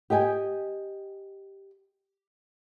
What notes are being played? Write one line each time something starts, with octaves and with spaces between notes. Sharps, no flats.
G4 D#5 G5 G#5